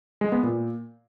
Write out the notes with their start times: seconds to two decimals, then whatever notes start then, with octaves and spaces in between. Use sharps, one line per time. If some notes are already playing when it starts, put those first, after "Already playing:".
0.21 G#3
0.32 B3
0.43 A#2